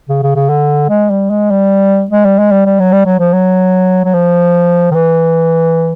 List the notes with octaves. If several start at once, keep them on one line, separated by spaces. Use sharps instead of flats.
C#3
C#3
C#3
D3
G#3
G3
G#3
G3
G#3
G3
G#3
G3
G3
F#3
G3
F#3
F3
F#3
F#3
F3
D#3
E3